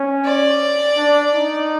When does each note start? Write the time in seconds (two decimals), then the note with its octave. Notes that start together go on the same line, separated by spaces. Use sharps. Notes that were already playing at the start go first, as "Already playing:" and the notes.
Already playing: C#4
0.25 D5
0.97 D4
1.35 D#4